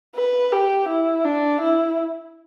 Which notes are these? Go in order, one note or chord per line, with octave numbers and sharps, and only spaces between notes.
B4
G4
E4
D4
E4